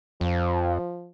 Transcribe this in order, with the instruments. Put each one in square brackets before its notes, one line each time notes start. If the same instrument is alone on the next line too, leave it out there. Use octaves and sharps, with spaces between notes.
[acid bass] F2 [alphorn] F3